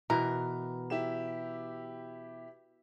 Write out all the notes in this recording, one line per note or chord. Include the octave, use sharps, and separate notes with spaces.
B2 E3 A#4
E4 G4 E7